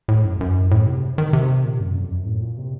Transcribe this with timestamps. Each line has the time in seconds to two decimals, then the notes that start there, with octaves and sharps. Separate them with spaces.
0.08 A2
0.25 F#2
0.41 F#2
0.71 A2
0.87 C3
1.18 D#3
1.33 C3
1.65 A#2
1.80 F#2
1.95 F2
2.11 F#2
2.26 A2
2.42 A#2
2.58 C3